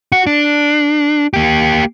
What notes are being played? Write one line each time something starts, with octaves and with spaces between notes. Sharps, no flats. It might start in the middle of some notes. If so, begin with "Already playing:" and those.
F#4
D4
A#3 G4